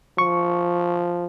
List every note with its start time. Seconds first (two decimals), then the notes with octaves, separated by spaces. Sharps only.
0.18 F3 C#6